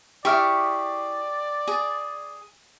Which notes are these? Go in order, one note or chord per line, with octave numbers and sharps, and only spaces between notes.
E4 G4 G#4 D5 E5 C#6 F6
G#4